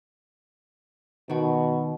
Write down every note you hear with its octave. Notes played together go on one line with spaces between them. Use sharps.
B2 D#3 F#4